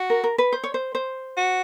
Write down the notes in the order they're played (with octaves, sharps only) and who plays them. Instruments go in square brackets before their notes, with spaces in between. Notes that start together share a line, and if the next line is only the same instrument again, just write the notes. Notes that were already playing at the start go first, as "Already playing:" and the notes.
Already playing: [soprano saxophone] F#4
[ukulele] A#4
A#4
B4
C5
C#5
C5
C5
[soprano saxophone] F#4